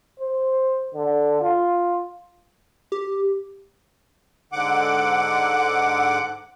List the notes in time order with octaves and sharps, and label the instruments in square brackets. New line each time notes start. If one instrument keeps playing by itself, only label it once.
[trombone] C5
D3
F4
[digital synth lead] G4
[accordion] G#2 D3 F#5 D6